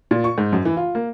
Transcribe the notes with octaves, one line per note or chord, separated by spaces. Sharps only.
A#2
C#6
G#2
F#2
E3
F4
A#3